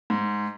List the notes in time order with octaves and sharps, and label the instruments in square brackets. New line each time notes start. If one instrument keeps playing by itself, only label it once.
[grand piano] G#2